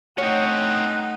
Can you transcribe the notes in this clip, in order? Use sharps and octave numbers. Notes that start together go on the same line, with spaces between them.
A3 C4 C#4 D#4 C#5 F#5